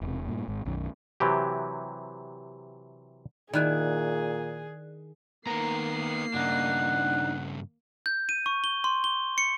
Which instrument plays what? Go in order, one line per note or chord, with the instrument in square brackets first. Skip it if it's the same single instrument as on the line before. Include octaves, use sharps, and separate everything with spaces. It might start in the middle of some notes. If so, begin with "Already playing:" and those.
[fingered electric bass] E1 C3
G2 A#2
G#1 G#2
B1 F#2 D#3
[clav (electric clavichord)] C3 E3 F#3 G4
[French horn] A#2 [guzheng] D#3 E4 G#5 [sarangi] G#4 [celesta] D5 F#6
[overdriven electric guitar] D#3 A#5 [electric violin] A#3 C7 [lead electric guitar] B3 A#4
[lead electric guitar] G2 C#3 [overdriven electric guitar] D4 D#4 [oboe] F#5
[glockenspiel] G6
D#7
C#6
G7
C6
G7
C#7